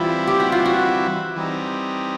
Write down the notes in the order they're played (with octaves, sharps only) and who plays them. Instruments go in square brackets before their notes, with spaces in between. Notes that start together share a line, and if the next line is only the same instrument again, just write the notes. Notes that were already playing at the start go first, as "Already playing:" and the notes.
Already playing: [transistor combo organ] E3 G3 C4 E4 [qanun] F4
[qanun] G4
F#4
F4
F#4
[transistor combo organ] E3 G3 C4 D#4